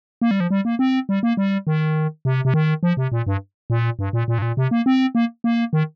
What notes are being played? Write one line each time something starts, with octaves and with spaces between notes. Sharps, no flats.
A#3
G3
F3
G3
A#3
C4
G3
A#3
G3
D#3
C3
C3
D#3
F3
C3
A#2
G2
A#2
G2
A#2
A#2
G2
A#2
C3
A#3
C4
A#3
A#3
D#3